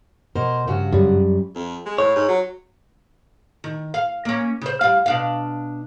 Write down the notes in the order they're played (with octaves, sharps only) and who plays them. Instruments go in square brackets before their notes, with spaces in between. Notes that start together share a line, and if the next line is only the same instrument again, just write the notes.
[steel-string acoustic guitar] B2 A#4 C5
G2 C#3 F#4
[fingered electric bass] F#2 G3
[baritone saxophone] F2
G#3
[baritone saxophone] A2 [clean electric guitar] C#5
[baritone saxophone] G#2
F#3
[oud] D#3
F5
A#3 C#4
C#3 C5
G3 F5
B2 D4 F5